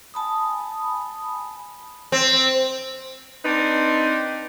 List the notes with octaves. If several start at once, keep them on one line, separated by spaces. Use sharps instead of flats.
G#5 A5 B5 D#6
C4
C4 D4 D#4 B4